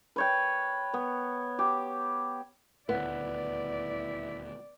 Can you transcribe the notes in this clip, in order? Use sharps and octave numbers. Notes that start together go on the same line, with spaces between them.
B4 C#5 G5
B3
G4
D#1 D2 B3 E4 D5